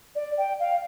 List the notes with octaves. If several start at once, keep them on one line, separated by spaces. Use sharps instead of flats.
D5
G5
F5